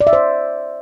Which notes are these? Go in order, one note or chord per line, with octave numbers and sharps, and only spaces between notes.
D5
E5
C5